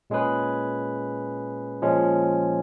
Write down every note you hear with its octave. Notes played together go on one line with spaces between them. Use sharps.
A#2 G#3 C#4 G#4 B4
A#2 F3 G#3 C#4